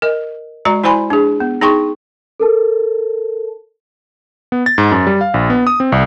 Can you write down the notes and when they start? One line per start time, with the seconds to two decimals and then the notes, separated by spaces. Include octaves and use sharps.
0.02 A#4 D#5
0.65 G#3 F#4 D5 A#5
0.84 E4 C5 D5 G#5 B5 C6
1.10 D4 G#4
1.40 B3
1.61 D#4 G#4 G5 C6 C#6
2.40 A4 A#4 A5
4.52 B3
4.66 A6
4.78 G#2
4.91 F#2
5.07 G3
5.21 F5
5.34 A#1
5.50 B3
5.67 D#6
5.80 C4
5.92 C2